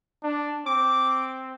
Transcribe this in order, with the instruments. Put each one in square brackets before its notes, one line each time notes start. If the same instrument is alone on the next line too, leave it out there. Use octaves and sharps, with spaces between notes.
[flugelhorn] D4
[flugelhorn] C4 [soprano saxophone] D6